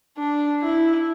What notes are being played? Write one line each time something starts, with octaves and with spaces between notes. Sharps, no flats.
D4
E4